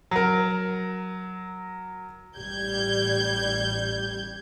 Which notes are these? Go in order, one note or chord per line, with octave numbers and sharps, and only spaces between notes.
F#3 A#4
A1 G3 G6 G#6